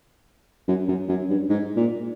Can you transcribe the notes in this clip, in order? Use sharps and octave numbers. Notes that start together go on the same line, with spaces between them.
F#2
F#2
F#2
G2
G#2
A#2